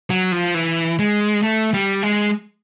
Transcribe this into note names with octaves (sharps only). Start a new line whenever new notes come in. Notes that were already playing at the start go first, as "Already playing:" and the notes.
F#3
F3
E3
G#3
A3
G3
G#3